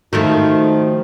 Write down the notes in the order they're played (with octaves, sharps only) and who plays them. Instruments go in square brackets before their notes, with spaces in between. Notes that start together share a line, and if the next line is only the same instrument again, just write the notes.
[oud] D#3 F3 A3 [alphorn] D#4 [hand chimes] F#4